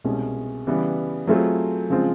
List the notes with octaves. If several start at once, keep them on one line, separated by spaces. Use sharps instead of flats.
C2 B2 G#3 C#4
C#3 E3 G3 B3
F#3 A3 C4 F4 G#4
C#3 F3 G#3 C4 F4